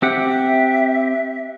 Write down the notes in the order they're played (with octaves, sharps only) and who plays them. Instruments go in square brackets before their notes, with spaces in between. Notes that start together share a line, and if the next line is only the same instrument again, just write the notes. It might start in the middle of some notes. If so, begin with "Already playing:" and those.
[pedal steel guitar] C4 G4 F#5 [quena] E5